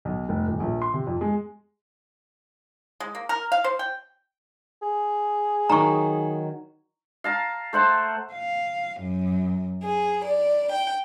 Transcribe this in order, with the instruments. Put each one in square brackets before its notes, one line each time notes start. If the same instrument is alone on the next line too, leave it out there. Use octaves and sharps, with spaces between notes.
[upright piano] B1
F1
D#1
A#1
C6
C3
F2
G#3
[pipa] G#3
A#3
A#4
F5
C5
G5
[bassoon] G#4
[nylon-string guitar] D#3 F#3 D#4 [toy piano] A#5 C#6
[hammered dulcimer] F5 A5 A#5
A3 C5 F#5 A5
[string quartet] F5
F#2
G#4
D5
G5